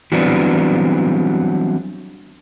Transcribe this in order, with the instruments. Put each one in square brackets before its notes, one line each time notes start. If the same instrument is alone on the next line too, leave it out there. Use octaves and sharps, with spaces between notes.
[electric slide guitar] E3 F#3 G3 B3 C4 D4